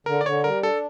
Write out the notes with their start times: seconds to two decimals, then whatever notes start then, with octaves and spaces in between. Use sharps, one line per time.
0.06 D3 A#4
0.21 D5
0.25 D3 C#5
0.44 G3 A#4
0.63 D4 A4